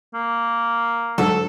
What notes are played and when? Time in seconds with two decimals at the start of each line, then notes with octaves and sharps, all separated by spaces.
0.14 A#3
1.18 G#2 D3 F#3 A4